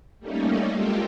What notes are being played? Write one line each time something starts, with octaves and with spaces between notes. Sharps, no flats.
G3 A3 A#3 C#4 D#4
G#3 F4 G4 A4 A#4